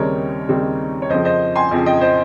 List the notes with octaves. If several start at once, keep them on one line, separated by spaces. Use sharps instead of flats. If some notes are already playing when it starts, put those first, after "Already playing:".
Already playing: D#2 C#3 G3 C4 D#4 A#4 C#5
D#2 C#3 G3 C4 D#4
C#5
F2 C#3 F3 C4 C5 D#5
C5 D#5
G#5 C6
F2 C#3 F3 C4
D#5 G5
C5 D#5